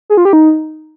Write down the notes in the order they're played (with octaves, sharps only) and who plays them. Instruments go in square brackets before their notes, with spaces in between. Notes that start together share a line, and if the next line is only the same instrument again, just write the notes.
[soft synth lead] G#4
F4
G4
D#4